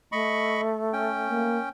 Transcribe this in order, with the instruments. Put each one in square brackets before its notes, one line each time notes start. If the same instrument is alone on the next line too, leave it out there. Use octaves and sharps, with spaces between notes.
[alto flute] A3 [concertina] D#5 B5 C#6
[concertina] C#4 G5
[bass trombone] A#3